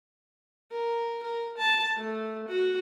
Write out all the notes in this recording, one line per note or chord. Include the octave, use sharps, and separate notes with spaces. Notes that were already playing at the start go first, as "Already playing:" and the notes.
A#4
A#4
A5
A3
F#4